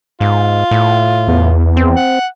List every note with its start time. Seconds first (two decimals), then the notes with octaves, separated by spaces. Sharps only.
0.20 G#2 F4
0.71 A2
1.27 E2
1.77 C4
1.96 F#5